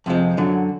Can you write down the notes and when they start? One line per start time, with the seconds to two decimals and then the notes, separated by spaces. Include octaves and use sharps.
0.06 F2 C3 F3 G#3
0.37 F#2 D3 F#3